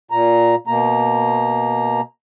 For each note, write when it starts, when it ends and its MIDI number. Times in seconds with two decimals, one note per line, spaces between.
0.11 0.55 46
0.11 0.55 82
0.67 2.01 47
0.67 2.01 58
0.67 2.01 82